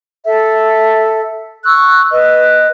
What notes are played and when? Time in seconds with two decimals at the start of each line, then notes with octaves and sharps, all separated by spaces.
0.24 A4 E5
1.65 C#6 E6 F#6
2.12 B4 D#5